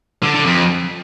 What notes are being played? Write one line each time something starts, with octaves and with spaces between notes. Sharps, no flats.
D3
D3
F2